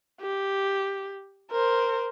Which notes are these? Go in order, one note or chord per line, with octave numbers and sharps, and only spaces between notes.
G4
A#4 C5